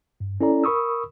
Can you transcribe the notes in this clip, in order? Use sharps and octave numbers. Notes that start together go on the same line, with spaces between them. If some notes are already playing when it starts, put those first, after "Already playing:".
G2
C#4 E4 A4 D5 A#5
A#4 B5 C#6 D#6 E6